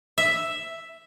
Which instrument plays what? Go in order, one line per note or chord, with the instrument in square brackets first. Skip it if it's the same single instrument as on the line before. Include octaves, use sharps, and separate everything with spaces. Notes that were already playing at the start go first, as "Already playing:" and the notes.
[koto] E5